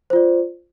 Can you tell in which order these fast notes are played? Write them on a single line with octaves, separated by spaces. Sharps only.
C5 F4 D5